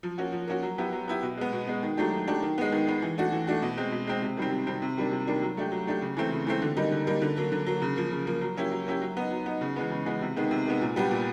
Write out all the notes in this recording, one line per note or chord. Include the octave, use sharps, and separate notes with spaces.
F3
A#3 C#4 F#4
F3
A#3 C#4 F#4
F#3
B3 E4 G4
F#3
B3 E4 G4
B2
G#3 B3
B2
G#3 B3
D#3
F#3 A3 D4 G4
D#3
F#3 A3 D4 G4
D#3
G#3 B3
D#3
G#3 B3
E3
A3 D4 F#4
E3
A3 D4 F#4
B2
G#3 C4
B2
G#3 C4
C3
D#3 G3 C4
C3
D#3 G3 C4
C3
D#3 G3 A#3 D4
C3
D#3 G3 A#3 D4
F#3
A3 D4 G4
F#3
A3 D4 G4
C#3
E3 A3 C4
C#3
E3 A3 C4
D3
G3 A#3 D#4
D3
G3 A#3 D#4
D3
F#3 A#3
D3
F#3 A#3
C#3
F3 A#3
C#3
F3 A#3
F#3
A#3 C#4 E4 G4
F#3
A#3 C#4 E4 G4
F#3
B3 D#4
F#3
B3 D#4
C#3
E3 G#3 B3
C#3
E3 G#3 B3
C3
D#3 G#3 B3
C3
D#3 G#3 B3
A#2
G3 B3 D4 G4
A#2